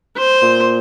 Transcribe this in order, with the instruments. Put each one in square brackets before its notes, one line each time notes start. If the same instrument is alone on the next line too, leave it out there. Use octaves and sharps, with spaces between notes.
[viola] C5
[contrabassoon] A#2